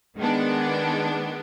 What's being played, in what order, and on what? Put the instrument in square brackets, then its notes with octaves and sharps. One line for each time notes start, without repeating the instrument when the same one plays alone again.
[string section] D#3 G#3 B3 D4